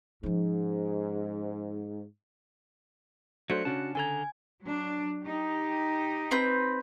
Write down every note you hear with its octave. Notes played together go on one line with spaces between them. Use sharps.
G#2 F3 C#4
F#3 A3 D4 F#4 A4 C5 F#6 C#7
C#3 C#4 D4 F#4 A5
D3 A4 G#5 A#5 G#6
F#3 D4
D#4 G4
C4 B4 G6